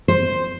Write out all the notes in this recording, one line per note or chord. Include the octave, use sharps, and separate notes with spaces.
C5